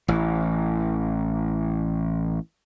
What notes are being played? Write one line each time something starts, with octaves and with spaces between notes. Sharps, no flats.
A1 E3